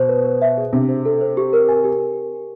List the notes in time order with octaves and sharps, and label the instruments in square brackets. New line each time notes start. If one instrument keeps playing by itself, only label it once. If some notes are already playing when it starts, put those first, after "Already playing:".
Already playing: [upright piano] B2 [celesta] C5
[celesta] B4
B4
E5
G#4
[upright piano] C3 [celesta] D4
[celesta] C5
A4
C5
G4
A#4
G#5
G4